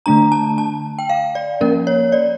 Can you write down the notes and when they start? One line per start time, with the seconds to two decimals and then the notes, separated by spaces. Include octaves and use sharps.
0.06 D3 A3 D4 A#5
0.32 A5
0.58 A5
0.99 G5
1.09 F5
1.35 D5
1.61 F3 A#3 C#4 A#4
1.87 C#5
2.12 D5